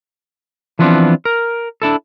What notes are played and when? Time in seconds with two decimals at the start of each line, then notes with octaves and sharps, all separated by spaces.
0.79 E3 F3 B3 C4 D4
1.25 A#4
1.82 D4 E4 A4